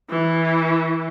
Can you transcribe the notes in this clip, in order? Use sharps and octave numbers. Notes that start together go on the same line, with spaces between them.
E3